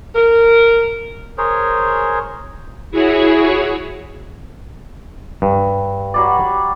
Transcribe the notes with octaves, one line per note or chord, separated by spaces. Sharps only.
A#4
G#4 A#4 C5 C#5
E4 F#4 G#4 C#5
G2
F#3 G3 D5